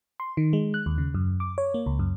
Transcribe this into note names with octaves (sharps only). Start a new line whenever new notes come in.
C6
D#3
G#3
F#6
D#2
C#3
F#2
D6
C#5
A#3
C#2
F#2